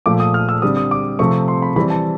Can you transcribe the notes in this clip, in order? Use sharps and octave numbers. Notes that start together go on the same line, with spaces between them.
A#2 F3 A3 D6
D#6
F6
E6
D3 G3 C4 D#6
D#6
D6
C3 F3 A3 C4 C#6
C6
B5
E3 G3 C4 B5
A5